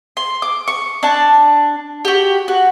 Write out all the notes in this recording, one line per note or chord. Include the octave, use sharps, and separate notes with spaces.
C6
D6
C#6
D4 A5
F#4 G4
F#4